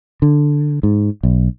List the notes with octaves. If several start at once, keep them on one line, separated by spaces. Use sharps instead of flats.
D3
G#2
B1